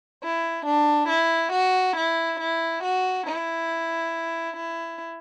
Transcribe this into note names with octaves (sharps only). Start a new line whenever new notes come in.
E4
D4
E4
F#4
E4
E4
F#4
E4
E4